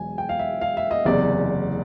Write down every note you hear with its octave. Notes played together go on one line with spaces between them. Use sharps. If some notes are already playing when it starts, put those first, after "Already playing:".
Already playing: E1 E2 F#3 G#5
G5
F5
E5
F5
E5
D#5
F#1 E2 C3 D5